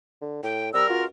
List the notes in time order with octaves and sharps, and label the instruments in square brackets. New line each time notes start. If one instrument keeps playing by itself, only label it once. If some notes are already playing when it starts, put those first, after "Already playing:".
[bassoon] D3
[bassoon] A2 [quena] G5
[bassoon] C3 [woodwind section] G3 E6 [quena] A#4
[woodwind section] C#2 F4 [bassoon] F#4